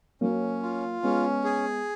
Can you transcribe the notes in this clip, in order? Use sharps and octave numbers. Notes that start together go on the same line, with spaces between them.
F#3 A#3 C#4
F4
G#3 B3 C#4
G#4